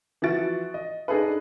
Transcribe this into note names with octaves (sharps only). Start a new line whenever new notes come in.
E3 F3 E4 F#4 A6 D7
D#5
D4 D#4 G#4 A4 B4